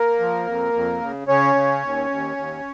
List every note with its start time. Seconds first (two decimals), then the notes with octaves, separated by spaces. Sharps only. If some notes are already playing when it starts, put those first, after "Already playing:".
Already playing: A#3 A#4
0.20 F3
0.47 F2
0.73 F2
1.01 C#3
1.28 C#3 C#4 C#5
1.55 C#3
1.83 D#2
2.10 D#2
2.36 D#2